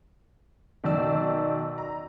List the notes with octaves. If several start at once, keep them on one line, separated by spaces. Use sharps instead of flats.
B1 D#3 D5 E6
A#5